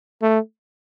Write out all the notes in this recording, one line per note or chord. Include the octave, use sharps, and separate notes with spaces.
A3